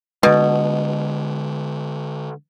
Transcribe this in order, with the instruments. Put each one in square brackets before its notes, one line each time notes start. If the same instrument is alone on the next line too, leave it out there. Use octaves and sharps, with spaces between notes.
[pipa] B2 [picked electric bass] D3 G#3